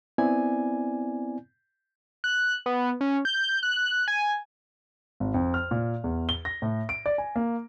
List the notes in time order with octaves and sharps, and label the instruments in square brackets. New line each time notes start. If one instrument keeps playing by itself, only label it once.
[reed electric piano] B3 C4 E4 D5 G#5
[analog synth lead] F#6
B3
C#4
G6
F#6
G#5
[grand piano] G#1
F2
F6
A#2
E2
G7
A#6
A2
D7
D5
G#5
A#3